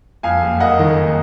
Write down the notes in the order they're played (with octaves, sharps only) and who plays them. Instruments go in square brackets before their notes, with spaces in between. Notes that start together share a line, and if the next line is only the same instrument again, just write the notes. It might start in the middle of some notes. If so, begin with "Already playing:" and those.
[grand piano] F2 F5 G#5
F#1
A#3 D#5 F#5
D#3